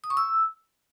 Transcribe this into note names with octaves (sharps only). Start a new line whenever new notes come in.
D#6
C#6
E6